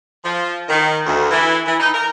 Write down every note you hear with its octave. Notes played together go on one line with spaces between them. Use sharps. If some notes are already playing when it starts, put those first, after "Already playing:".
F3
D#3
D2
E3
E3
D#4
A#4